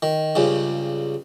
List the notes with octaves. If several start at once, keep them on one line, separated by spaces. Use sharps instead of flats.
D#3
C#2 G2 C#3